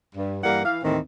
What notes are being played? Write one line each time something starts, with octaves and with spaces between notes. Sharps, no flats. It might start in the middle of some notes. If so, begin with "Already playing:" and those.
G2
G2 E3 G3 A#3 A#4 F#5
E3 F5
D#2 A2 D#3 E3 C4